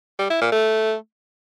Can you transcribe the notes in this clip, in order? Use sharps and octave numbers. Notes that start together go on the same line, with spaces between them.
G3
E4
A#2
A3